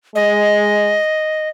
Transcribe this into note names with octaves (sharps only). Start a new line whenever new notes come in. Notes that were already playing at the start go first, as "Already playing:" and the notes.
G#3 D#5